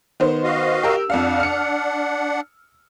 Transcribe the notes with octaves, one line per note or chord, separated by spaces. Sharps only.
D#3 B3 C5
F#4 D#5 F5
G4 A#4 E6
F2 D4 F5 F#5
F6 C#7